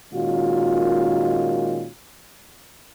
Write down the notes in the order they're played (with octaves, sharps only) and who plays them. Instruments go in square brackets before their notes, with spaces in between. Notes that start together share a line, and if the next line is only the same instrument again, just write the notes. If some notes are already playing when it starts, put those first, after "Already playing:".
[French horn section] A#2 D#3 G#3 C#4 F4 F#4